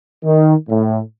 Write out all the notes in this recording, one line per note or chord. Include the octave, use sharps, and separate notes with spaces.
D#3
A2